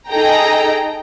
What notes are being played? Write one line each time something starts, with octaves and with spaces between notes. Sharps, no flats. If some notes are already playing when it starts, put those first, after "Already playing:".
D#4 G#4 A4 D#5 G5 A#5